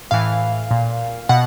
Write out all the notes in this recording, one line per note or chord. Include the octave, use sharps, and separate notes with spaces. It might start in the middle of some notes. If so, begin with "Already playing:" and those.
A2 E3 F5
A#2
B2 F#5